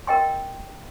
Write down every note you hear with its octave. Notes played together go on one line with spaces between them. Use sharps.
A#4 D#5 G5 C6